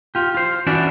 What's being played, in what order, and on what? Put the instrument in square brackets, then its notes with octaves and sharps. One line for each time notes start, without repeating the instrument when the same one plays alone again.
[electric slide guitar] F4 G4
F4 C5
E3 C#4 D4 E4 F#4 D5